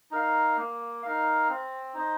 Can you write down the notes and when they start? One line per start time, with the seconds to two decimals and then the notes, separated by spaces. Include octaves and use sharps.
0.11 D#4 A#4 F5
0.57 A#3
1.03 D#4 A#4 F5
1.49 C4
1.94 D#4 C5 D#5